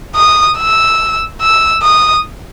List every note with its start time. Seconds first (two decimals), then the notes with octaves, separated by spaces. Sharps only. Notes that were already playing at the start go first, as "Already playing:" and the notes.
0.16 D#6
0.58 E6
1.41 E6
1.83 D#6